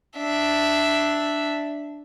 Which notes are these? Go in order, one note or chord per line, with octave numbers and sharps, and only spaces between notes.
D4 E5